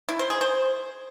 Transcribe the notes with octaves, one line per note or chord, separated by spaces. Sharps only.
E4
C5
G#4
C5